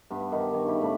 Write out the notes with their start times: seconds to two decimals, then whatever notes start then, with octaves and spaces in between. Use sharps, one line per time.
0.10 G2 B3 E5
0.32 D#3 D#4 G4
0.52 D#3 C#5 C#6
0.67 C#3 E4 G4
0.81 A2 D4 B5